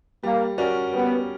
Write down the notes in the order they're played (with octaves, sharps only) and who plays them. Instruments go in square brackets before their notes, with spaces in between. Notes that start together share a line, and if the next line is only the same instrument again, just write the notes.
[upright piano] G3 [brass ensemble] A#3
[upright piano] C#4 F#4 A#4 D5
[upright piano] G3 [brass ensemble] B3